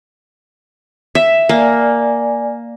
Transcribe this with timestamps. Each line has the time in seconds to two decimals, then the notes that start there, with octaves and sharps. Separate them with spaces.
1.15 E5
1.49 A#3 D5 G#5